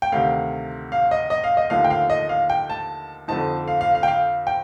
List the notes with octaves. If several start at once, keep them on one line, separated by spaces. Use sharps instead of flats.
G5
D2 C3 D#3 F5
F5
D#5
D#5
F5
D#5
D#2 D3 F3 A3 D#4 F5
G5
F5
D#5
F5
G5
A5
F2 D3 F3 C4 D#4 A5
F5
F5
F5
G5
F5
G5